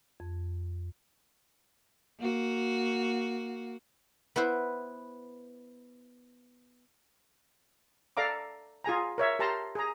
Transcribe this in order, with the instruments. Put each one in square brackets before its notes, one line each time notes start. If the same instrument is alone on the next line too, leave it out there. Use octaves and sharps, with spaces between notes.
[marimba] F2
[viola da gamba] A#3 F#4
[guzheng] B3 E4 B4 C5
[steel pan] A4 D5 F5 A#5 D6
F4 G#4 G#5 A#5
A#4 C#5 E5
G4 A#4 A5 A#5 C6
G#4 A#5